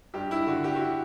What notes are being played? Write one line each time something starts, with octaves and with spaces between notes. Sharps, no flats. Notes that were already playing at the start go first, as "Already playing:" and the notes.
G2 G4
G2 E4
D3 F#4
D3 G4
F#4
E4